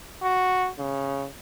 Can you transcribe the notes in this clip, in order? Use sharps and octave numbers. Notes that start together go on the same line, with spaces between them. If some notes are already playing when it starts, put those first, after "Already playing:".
F#4
C#3